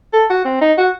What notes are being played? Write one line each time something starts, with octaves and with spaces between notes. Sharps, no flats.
A4
F#4
C4
D#4
F#4